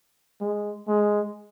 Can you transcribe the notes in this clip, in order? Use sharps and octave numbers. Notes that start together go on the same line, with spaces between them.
G#3
G#3